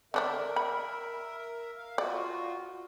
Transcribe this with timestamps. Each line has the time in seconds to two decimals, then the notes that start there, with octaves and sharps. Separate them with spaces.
0.14 D3 D4 A#4 D5 E5
0.56 B5
1.78 F5
1.98 F4 F#4 D5